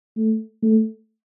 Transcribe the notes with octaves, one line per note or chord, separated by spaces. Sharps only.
A3
A3